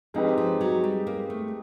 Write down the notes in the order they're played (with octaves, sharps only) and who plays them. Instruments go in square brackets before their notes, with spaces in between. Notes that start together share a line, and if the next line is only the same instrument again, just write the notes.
[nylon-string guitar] F3 [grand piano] G#3 C4 D#4 G4 B4
[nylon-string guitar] F3
F#3
G3
A#3
A3